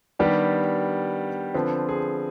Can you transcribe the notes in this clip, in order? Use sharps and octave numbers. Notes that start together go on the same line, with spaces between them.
D#3 G3 B3 D4 G4
D3 F3 C4 B4
G#4